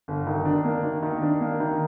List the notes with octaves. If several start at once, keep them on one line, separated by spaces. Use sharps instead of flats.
G1
D#3
D4
A#3
D#3
D#3
D4
A#3
D#3